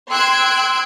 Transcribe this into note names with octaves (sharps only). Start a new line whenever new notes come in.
G5 C6 E6 F#6 G#6 D7